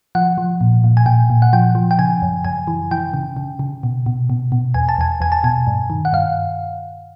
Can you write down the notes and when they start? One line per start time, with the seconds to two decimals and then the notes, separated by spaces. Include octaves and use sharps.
0.15 F3 F#5
0.38 F3
0.61 A#2
0.84 A#2
0.97 G#5
1.06 A#2 G5
1.30 A#2
1.42 F#5
1.53 F3 G5
1.75 F3
1.91 G5
1.99 C#3 G#5
2.22 F#2
2.45 F#2 G#5
2.68 E3
2.91 E3 G5
3.14 C#3
3.37 C#3
3.59 C#3
3.83 B2
4.06 B2
4.30 B2
4.52 B2
4.74 E2 G#5
4.89 A5
4.98 E2 G#5
5.20 E2 G#5
5.32 A5
5.44 B2 G#5
5.67 G2
5.90 D#3
6.05 F#5
6.13 G2 F5